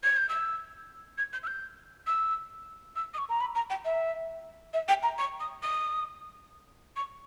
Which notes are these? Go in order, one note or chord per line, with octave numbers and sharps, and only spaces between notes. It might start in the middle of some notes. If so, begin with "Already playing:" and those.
G#6
G6
E6
G#6
G6
E6
G6
E6
E6
D#6
C#6
A#5
B5
A#5
G5
E5
E5
G5
A#5
C#6
D#6
D#6
C#6